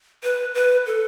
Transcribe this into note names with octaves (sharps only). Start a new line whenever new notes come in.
B4
B4
A4